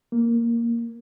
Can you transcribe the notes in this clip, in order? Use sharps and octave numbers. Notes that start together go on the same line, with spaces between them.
A#3